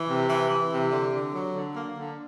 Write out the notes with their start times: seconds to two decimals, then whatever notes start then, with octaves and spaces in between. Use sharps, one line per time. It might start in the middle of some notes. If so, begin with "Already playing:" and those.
Already playing: E3
0.08 C3
0.29 E3
0.50 E3
0.71 C3
0.91 D3
1.12 D3
1.33 F#3
1.54 D3
1.74 A#3
1.96 D3